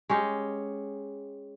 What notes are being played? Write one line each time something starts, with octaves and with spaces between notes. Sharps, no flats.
G#3 C#4 G4